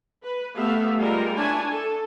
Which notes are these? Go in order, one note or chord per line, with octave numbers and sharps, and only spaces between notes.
B4
A3 B3 G4 E5 F5
G3 G#3 F4 A#4
D4 E4 C#5 G#5 A5
A4